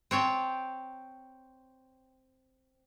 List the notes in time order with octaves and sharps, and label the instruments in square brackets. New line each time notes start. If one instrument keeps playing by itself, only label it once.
[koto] C4 C#5 G5 A5